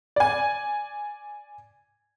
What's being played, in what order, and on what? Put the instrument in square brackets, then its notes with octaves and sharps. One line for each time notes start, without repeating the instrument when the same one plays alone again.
[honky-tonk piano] D5 G#5